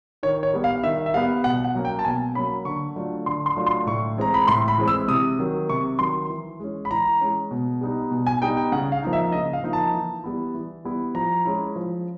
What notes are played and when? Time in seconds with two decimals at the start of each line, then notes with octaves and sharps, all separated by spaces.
0.23 D#3 C#5
0.43 C#5
0.54 G3 B3
0.64 F5
0.83 D#3 E5
1.06 E5
1.14 G3 B3 F5
1.44 B2 F#5
1.64 F#5
1.75 F#3 A#3 C#4
1.85 G5
1.99 A5
2.05 B2 G#5
2.35 F#3 A#3 C#4 B5
2.65 D3 C#6
2.96 F#3 A3 D4 F4
3.26 D3 C6
3.46 C6
3.57 F#3 A3 D4 F4
3.67 C6
3.87 A2 C#6
4.17 E3 G#3 C4 A#5
4.34 B5
4.47 A2 C6
4.68 B5
4.78 E3 G#3 C4
4.88 E6
5.08 C3 D#6
5.39 D#3 F#3
5.69 C3 C#6
5.99 D#3 F#3 C6
6.29 E3
6.60 G#3 C#4
6.85 B5
6.91 E3 A#5
7.21 G#3 C#4
7.51 B2
7.81 G3 B3 D#4
8.11 B2
8.27 G#5
8.42 G3 B3 D#4 G5
8.57 G5
8.72 C#3 F#5
8.92 F5
9.03 F3 A#3 D#4
9.13 E5
9.32 C#3 D#5
9.53 F5
9.63 F3 A#3 D#4
9.73 A5
9.94 E3
10.24 G3 B3 E4
10.54 E3
10.85 G3 B3 E4
11.15 F3 A#5
11.45 G#3 C#4 E4
11.76 F3